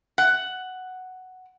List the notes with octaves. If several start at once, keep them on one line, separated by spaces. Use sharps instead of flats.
F#5